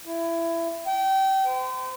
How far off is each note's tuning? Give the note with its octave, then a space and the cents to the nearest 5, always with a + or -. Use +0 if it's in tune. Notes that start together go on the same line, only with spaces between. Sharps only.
E4 +20
G5 -25
C5 -35